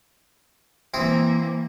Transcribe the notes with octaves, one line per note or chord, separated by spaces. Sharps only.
E3 A#3 C4 E4 D#6